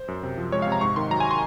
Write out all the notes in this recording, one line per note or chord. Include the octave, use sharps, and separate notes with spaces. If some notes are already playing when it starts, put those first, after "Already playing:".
Already playing: C5
F#2
C3
F3
G#3 C#5
F5
C3
A#5
G#2 C#6
D#3 C6
F#3 A#5
G#5
C6